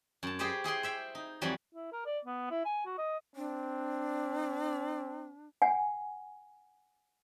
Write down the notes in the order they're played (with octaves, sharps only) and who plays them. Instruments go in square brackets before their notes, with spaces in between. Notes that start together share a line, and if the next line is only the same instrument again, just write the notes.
[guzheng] F#2 A5
G4 G#4 B4 C5 D5
E4 G#4 G5 C6
C5 E5 G5
D#4
F2 E3 F#3 G3
[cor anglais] E4
A#4
D5
B3
E4
G#5
F#4
D#5
[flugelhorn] C4 [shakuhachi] D4
[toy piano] F#5 G#5